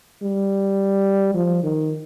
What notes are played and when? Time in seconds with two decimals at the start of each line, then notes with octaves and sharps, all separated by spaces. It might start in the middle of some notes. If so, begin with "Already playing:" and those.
0.23 G3
1.35 F3
1.64 D#3